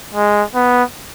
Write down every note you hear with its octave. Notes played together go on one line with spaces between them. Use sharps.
G#3
B3